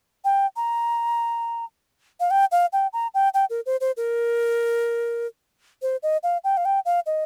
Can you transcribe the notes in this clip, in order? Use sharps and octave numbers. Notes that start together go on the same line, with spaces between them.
G5
A#5
F5
G5
F5
G5
A#5
G5
G5
A#4
C5
C5
A#4
C5
D#5
F5
G5
F5
G5
F5
D#5